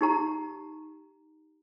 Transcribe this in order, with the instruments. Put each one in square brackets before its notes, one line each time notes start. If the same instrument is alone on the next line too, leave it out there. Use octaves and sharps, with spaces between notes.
[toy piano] D#4 G4 A#5